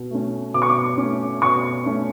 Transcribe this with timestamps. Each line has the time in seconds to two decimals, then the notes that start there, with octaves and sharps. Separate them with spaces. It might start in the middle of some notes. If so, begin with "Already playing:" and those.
Already playing: B2
0.11 A3 C#4
0.54 B2 D6
0.62 C#6
0.70 D6
0.97 A3 C#4
1.42 B2 C#6
1.85 A3 C#4